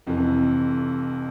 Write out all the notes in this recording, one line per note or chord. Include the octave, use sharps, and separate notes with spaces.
F1 F2 E3